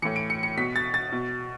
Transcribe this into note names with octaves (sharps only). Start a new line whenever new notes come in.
A2 E3 C#7
D7
C#7
C#7
B2 B6
A6
A6
B2